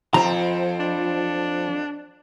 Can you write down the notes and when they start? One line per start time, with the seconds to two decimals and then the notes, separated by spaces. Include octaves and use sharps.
0.14 F2 F3 C4 A#5
0.80 D4